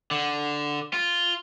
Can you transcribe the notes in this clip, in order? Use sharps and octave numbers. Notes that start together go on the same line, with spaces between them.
D3
F4